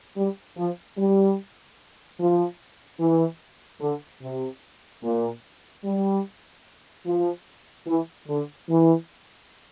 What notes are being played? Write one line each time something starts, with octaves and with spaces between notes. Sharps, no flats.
G3
F3
G3
F3
E3
D3
C3
A#2
G3
F3
E3
D3
E3